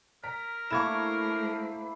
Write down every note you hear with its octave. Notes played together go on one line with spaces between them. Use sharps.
A#4 A#5 B6
A3 A#3 D4 E4 C5 C#6 G#6 E7